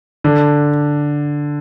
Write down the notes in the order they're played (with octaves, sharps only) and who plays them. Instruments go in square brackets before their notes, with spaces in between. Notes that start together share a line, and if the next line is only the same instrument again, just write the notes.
[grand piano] D3